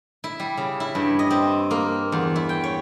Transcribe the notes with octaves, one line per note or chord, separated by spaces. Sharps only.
E4
G3
C#3
E4
G2
D#5
C4
A#3
E2
E4
G5
C#5